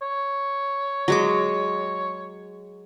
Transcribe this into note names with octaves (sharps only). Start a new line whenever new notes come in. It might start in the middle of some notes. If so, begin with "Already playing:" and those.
C#5
F#3 G#3 D6